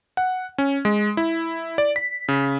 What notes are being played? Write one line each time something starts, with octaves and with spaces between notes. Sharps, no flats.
F#5
C#4
G#3
E4
D5
B6
C#3